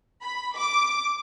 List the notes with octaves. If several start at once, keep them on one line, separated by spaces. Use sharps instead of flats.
B5
D6